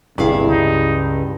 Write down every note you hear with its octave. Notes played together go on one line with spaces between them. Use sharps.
G1 D2 G2 C3 E4 G#4 F5
C#2 D#4